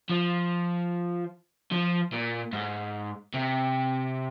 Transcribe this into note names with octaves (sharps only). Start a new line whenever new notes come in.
F3
F3
A#2
G#2
C3